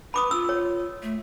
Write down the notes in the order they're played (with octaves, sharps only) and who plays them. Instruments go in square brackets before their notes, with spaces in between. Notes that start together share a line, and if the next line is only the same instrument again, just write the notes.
[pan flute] B4 [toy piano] B5 D6 D#6
[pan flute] F4 [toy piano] E6
[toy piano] C#5
[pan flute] A3